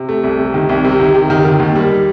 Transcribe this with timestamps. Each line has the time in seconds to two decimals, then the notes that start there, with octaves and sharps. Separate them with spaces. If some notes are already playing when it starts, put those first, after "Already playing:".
Already playing: C3
0.09 A3
0.23 C2
0.39 C3
0.54 D#3
0.69 C2
0.85 C3
1.00 D#3
1.15 C3
1.30 D#3
1.45 D#3
1.60 D#2
1.75 G3